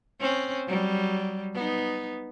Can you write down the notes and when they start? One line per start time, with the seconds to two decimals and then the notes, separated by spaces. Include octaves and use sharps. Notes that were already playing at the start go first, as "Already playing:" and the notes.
0.20 C4 C#4
0.67 F#3 G3
1.54 B3 D#4